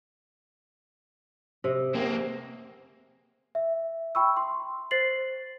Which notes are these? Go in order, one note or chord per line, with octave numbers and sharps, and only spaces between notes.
C3 D#5
C3 A#3 C4 G#4
E5
G5 B5 C#6 E6
C6
C5 A6 C7 F#7